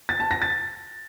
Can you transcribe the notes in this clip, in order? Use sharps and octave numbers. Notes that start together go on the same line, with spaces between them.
A6
A5
A#6
A6